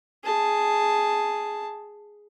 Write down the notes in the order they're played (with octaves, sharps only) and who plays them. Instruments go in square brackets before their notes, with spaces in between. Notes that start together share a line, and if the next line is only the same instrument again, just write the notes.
[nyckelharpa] G#4 A5